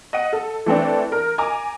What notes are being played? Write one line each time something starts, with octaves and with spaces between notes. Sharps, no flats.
D#5 F#5 D#7
A4
E3 A3 C4 D4
A#4
G#5 A#5 D6